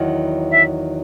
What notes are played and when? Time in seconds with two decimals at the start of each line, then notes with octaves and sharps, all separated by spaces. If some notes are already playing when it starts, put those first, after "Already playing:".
Already playing: E2 D#3 F#3
0.50 E5